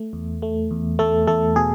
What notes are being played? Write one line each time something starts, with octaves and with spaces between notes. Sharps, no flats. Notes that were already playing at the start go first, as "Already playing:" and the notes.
Already playing: A3
E2
A3
E2
E2 A3 A4
E2 A3 A4
B2 G#4